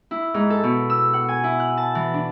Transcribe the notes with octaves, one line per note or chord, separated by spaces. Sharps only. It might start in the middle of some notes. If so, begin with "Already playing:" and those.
E4
G#2
A4
B2
E6
F#5
G#5
E4
F#6
A5
E3
D4